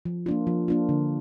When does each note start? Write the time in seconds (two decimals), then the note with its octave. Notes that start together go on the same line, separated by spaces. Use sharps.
0.05 F3
0.26 A#3 D4 F4
0.47 F3
0.68 A#3 D4 F4
0.89 D3